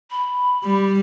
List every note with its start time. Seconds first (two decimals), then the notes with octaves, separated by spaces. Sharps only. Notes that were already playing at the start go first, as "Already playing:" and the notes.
0.11 B5
0.63 G3